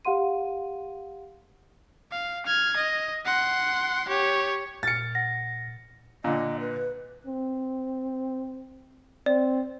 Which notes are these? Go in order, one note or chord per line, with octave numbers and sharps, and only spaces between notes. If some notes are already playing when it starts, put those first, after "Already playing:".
G4 F5 F#5 C6 D#7
F5
F6 G#6
D#5
F#5 C6
G4 C#5
A#2 F6 A6 C#7
F#5 A#6
A#2 D3 D#5
B4
C4
C4 D5